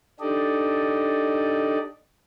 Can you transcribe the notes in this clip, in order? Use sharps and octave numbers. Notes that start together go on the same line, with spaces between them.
D4 D#4 G4 A4 D5 D#5